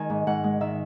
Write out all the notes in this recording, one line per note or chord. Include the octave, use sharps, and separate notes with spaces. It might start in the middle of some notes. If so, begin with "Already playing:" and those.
Already playing: D#3 G#3 G#5
G#2
G#2 F#5
G#3
D#3 E5